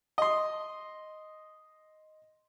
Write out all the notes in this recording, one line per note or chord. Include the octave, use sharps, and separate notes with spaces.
D#5 C6